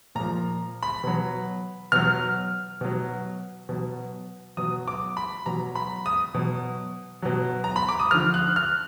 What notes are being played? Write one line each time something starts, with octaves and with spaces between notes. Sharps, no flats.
A#2 F3 A#5
B5
B2 F#3
B2 F#3 F6
B2 F#3
B2 F#3
B2 F#3 D#6
D6
B5
B2 F#3 A#5
B5
D#6
B2 F#3
B2 F#3
A#5
B5
D6
D#6
D3 F3 F6
F#6
F6